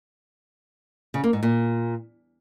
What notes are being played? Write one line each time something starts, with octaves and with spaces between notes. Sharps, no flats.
C#3
A#3
G#2
A#2